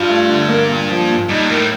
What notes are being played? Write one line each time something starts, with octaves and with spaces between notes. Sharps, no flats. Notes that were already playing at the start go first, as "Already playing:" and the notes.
Already playing: G2 F4
A3
D3
A#3
A#2
F3
A#2
G2 D#4
A2 A#4